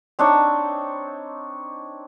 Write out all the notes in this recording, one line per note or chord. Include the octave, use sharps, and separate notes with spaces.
C4 D4 D#4 C#5